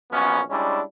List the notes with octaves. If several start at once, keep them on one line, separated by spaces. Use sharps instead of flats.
A#1 F#2 B3 C#4
G3 G#3 C#4 D4 E4